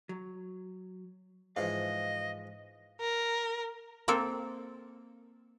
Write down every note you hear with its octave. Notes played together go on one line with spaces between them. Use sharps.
F#3
G#2 E3 F3 D#5 F5
A#4
A#3 C4 A4